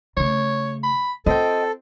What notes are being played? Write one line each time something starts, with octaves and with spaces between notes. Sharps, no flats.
C#3 A3 C#5
B5
C4 F4 A4 D#5 G5